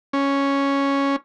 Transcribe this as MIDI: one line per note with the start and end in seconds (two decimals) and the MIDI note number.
0.13 1.16 61